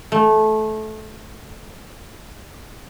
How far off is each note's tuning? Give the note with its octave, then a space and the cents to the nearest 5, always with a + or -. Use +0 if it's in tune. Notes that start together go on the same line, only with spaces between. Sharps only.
A3 -20